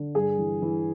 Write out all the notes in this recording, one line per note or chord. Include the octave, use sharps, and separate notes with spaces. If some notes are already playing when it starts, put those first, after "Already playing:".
Already playing: D3
G2 G#4
E3
E3